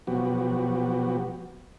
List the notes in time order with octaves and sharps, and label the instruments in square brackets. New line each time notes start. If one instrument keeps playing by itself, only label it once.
[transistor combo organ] B2 F3 F#3 B3 F#4 G4